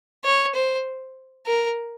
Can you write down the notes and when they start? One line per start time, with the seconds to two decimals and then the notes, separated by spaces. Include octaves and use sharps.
0.25 C#5
0.55 C5
1.46 A#4